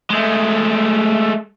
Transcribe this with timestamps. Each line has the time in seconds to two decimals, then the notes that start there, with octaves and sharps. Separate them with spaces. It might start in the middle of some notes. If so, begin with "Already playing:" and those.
0.10 G#3 A3